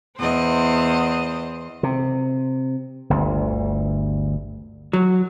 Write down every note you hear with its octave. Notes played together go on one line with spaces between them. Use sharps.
E2 C5 D#5
C3
G1 D2
F#3